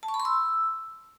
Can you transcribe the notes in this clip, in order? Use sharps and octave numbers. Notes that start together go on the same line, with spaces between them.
A5
C#6
B5
C6
E6